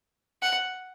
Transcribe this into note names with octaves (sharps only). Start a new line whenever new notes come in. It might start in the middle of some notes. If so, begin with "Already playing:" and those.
F#5